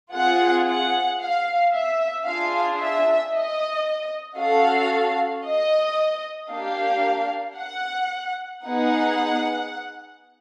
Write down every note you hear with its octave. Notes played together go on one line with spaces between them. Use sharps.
C4 F4 G#4 F#5
F#5
F5
E5
D4 F4 G#4 F5
E5
D#5
C#4 F#4 A4 F5
D#5
A#3 D4 G4 F5
F#5
B3 D#4 G#4 F#5